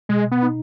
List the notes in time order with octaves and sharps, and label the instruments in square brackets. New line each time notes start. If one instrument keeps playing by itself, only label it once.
[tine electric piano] B2 [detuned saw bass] G#3
[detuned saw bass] B3
[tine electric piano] D#4